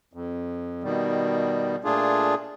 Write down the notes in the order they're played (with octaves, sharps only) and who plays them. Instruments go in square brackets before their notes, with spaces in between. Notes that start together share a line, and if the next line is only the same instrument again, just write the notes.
[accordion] F2
B2 D#3 G3
A#2 A3 D4 F4 G#4